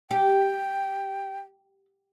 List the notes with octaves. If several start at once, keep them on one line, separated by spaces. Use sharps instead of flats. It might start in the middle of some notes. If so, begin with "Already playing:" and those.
G4 G5